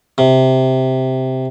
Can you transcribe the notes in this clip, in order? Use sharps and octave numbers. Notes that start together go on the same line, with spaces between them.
C3